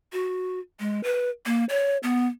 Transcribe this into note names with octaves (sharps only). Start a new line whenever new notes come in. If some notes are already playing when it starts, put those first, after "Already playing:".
F#4
G#3
B4
A#3
C#5
B3